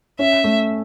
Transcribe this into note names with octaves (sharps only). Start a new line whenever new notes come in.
C#4 E5
A3